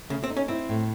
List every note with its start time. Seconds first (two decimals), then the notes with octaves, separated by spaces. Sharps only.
0.09 C#3 A3
0.24 C4
0.30 D#4
0.37 C#4
0.48 C4 E4
0.69 A2